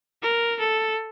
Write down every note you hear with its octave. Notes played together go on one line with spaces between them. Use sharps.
A#4
A4